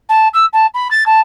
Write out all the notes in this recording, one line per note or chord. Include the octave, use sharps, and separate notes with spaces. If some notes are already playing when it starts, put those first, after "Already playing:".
A5
E6
A5
B5
A6
A5